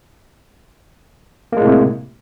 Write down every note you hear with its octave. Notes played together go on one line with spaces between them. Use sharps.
A2 C3 G#3 A#3